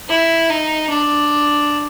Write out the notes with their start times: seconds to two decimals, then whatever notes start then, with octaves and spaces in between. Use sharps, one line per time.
0.08 E4
0.50 D#4
0.89 D4